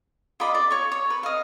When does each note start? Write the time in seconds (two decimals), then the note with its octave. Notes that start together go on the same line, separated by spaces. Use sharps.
0.40 F4 D5 D#5 B5
0.55 D5
0.71 C#5 C#6
0.92 C#5
1.10 B4
1.23 D#5 F5